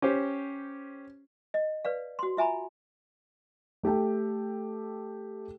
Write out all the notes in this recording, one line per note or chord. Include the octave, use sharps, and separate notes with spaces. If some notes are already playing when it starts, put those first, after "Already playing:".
C#4 G4 C5
D#5
B4 D5 F5
F#4 C6
F4 E5 G#5 A#5 B5
A3 G4 A4 G5